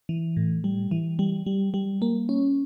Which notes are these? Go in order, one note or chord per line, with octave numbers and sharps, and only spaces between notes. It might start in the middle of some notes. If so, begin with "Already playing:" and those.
E3
A2
G3
E3
G3
G3
G3
A#3
C#4